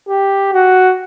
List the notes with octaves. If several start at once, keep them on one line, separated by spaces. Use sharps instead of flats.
G4
F#4